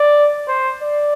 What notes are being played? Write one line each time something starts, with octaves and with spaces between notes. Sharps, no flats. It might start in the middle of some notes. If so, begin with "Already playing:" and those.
Already playing: D5
C5
D5